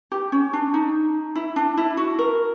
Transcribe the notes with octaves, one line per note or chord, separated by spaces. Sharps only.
G4
C#4
D4
D#4
E4
D4
E4
F#4
A#4